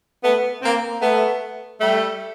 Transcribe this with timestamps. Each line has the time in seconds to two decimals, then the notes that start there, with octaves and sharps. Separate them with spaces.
0.23 A3 B3
0.62 A#3 C4
1.01 A3 B3
1.81 G3 A3